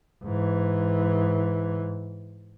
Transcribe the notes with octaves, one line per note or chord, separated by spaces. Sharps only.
G#2 E3